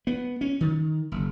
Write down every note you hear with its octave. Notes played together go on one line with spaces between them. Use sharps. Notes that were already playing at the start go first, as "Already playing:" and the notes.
B3
C#4
D#3
F#1